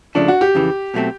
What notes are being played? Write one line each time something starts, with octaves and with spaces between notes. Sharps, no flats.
C#2 C#3 F3 A3 D4
F#4
G4
F2 C#3 E3
B2 F#3 A3 C4